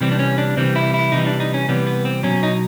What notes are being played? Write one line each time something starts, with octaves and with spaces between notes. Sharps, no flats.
C3 E3 G3 C4
D4
C#4
D4
C3 E3 G3 C4
E4
E4
C3 E3 G3 D#4
D4
D#4
C#4
C3 E3 G3 B3
B3
C4
B2 F#3 C#4
D#4